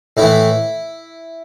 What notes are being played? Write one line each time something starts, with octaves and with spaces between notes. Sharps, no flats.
A2 E3 E4